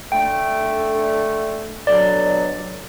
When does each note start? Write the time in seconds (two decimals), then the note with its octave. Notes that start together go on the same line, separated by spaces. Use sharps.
0.12 D3 A3 G5
1.87 B2 D3 F#3 D5